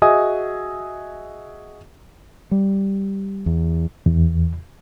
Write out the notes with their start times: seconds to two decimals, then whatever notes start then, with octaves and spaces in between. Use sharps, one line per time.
0.02 F#4 G#4 D#5 E5 G#5 D#6
2.51 G3
3.46 E2
4.06 E2